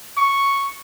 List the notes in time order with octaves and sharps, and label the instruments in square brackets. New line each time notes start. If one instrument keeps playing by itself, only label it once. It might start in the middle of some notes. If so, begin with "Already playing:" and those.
[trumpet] C#6